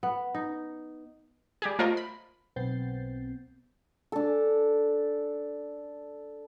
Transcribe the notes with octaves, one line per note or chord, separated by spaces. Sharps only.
B3
D#4
G3 G4 G#4
A3 F4 A#4 C5 D#5 F5
B5
B1 B3 C4 G6 A6 C7
D4 A4